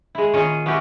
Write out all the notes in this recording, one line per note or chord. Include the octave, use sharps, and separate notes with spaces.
G#3 E4
A#2 D#3 C#4 G#4 C#5 D#5
B3 C#4 E4 F#4 G4